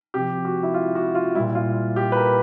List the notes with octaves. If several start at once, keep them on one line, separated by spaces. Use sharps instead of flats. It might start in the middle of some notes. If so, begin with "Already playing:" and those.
C3 F3 G4
F#4
E4
F4
F#4
F4
A#2 G3 E4
F4
G4
B4
A#4